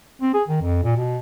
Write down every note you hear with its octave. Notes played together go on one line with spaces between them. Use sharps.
C4
G#4
D#3
F2
A#2
B2